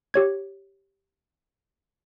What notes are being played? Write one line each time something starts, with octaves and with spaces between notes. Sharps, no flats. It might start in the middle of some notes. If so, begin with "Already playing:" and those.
G4 C#5 G#6